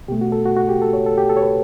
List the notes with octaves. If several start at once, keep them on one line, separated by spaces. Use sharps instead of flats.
B2 A3 G4
F#4
A4
F#4
F#4
G4
A4
C#5
A4
G4
A4
C#5
B4